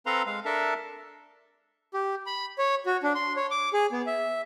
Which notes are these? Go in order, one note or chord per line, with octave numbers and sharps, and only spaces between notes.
C4 A4 B4 F5 A#5 C6
G#3 F5
D4 A4 A#4 E5 A5
G4
B5
C#5
F#4
D4
C6
C#5
D6
G#4
B3
E5